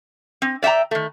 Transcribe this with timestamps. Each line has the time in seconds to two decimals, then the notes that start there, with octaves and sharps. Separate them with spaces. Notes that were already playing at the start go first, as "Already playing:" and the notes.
0.42 C4
0.63 D5 E5 F#5 G5 A#5
0.91 D#3 A3